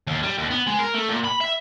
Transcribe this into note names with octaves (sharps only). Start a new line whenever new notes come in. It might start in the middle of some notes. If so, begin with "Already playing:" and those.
D#2
G3
D#2
B3
G#3
A#4
A3
A#2
B5
E5